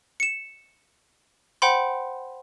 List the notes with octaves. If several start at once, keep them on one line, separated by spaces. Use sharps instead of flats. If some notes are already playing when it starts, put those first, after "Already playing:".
C#7 E7
C5 F#5 G5 B5 C6